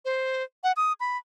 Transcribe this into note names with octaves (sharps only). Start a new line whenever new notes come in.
C5
F#5
D#6
B5